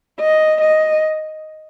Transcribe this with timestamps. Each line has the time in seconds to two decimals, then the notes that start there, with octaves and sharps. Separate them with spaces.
0.21 D#5
0.61 D#5